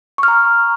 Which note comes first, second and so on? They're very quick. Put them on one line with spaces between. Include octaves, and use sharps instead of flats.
C#6 F6 A#5